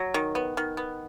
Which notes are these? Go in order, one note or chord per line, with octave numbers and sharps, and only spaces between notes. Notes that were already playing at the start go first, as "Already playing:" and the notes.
Already playing: F#3
D#3
B3
D#3
B3